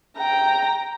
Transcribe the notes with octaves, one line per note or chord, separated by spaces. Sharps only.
G5 A#5